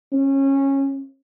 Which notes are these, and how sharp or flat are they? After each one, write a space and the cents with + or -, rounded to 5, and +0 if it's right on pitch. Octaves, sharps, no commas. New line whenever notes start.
C#4 -20